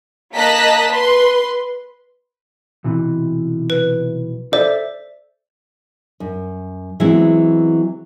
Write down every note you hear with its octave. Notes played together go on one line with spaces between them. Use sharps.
A#3 D#5 A5 A#5 F#6 B6
B4 C6
B1 C3 E3
B4
A4 C5 D5 E5
F#2
E3 F#3 G#3 B3 C4 E4